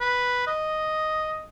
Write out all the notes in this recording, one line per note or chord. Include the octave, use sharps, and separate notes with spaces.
B4
D#5